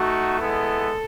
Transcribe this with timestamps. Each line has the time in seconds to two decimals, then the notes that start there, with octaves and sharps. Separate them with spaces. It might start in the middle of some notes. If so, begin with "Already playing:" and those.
Already playing: A3 D#4 F#4
0.38 G#3 B3 E4 A4